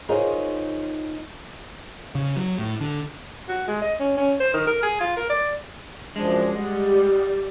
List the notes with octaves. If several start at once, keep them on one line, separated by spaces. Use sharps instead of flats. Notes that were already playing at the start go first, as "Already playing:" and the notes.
D#4 F4 G#4 A#4 C5 C#5
C#3
F#3
A2
D3
F#4
G#3
D#5
C#4
C#4
C5
D#3
A#4
G#4
F4
A#4
D5
F#2 F3 G#3 D4
G3 D#5 F#5